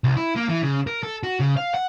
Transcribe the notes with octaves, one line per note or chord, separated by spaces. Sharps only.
C2
E4
A#3
E3
C#3
A#4
A4
F#4
C#3
F5
F#5